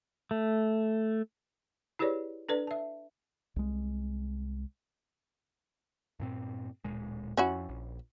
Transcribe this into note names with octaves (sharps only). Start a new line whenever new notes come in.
A3
E4 G4 G#4 B4 C#5 D5
D4 A4 B4 D5
E5 A5
C2 G#3
G2 A#2 C4
D1 A#2 G#3
F2 C#4 E4 F#4
A#1